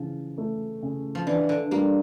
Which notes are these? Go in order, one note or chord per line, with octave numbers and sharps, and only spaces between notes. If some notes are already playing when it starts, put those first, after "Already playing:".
Already playing: C#3 E3 F3
A3
C#3
F3
E3 D4
D3
G3 A#3